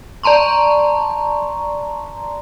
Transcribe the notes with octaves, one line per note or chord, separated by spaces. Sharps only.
D5 A5 A#5 C6 C#6